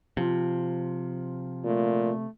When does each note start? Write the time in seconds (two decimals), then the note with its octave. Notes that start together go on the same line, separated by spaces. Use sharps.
0.17 C3 F3 F4
1.64 A#2 A3